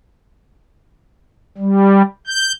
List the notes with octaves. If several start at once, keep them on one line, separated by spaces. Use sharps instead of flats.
G3
G6